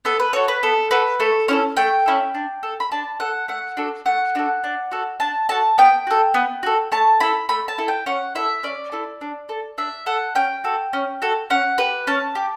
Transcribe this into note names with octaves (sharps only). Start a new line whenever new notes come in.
B3 A4
B4
F#4 A4 C#5
B4
B3 A4
F#4 A4 B4
A3 A4
C#4 E4 A4 C#5
A3 G5
C#4 E4 A4
D4
A4
B5
D4 A5
A4 F#5
A3 F#5
D4 F#4 A4
A3 F#5
D4 F#4 A4
D4
F#4 A4
D4 A5
F#4 A4 A5
B3 G5
F#4 A4
B3
F#4 A4
A3 A5
E4 A4 B5
A3 B5
A5
E4 A4
G5
C#4 F#5
E4 A4 E5
C#4 D5
E4 A4
D4
A4
D4 E5
A4 F#5
C#4 G5
F#4 A4
C#4
F#4 A4
C#4 F#5
G4 B4
C#4 A5
G4